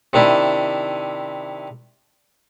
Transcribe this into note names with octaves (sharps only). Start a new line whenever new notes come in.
C3 D#3 D4 E4